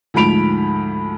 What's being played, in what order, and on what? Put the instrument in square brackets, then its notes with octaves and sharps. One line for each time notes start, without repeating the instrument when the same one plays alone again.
[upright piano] D2 G#2 F3 B5 D7 F7